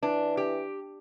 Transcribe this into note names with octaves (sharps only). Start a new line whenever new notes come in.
E3 D4
G4